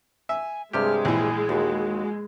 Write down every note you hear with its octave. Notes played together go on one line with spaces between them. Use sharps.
E5 G#5
G2 C3 G#3 G4 F6
A#1 E3 G#5
D#2 F#4